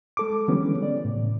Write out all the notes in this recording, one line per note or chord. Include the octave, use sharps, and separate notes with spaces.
G#3 A4 D6
D3 E3 G3 G#3 B3 C#4
D5
A2 C#3